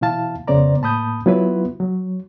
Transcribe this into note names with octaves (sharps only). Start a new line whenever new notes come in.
B2 E3 E4 F5 A5
F2 C#3 B3 C5 D5 A#5
A2 A#3 A5 B5 D#6 G6
F#3 B3 E4 F4 B4
F#3